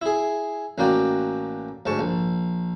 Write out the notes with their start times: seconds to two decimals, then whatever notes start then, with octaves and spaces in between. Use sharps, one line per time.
0.02 E4 G#4
0.78 A1 A#3 F#4 D5 G5
1.86 D2 G#2 A5 C#6
1.99 A#1